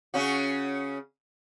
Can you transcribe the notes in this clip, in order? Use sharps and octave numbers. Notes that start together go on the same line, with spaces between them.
C#3 C#4 F#4